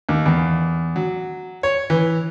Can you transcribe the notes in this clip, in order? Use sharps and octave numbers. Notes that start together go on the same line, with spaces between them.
D#2
E2
F#3
C#5
E3